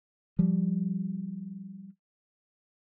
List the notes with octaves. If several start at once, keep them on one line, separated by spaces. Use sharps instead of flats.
F3 G3